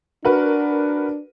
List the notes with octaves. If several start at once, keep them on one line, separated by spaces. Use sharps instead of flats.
D4 F#4 A#4 B4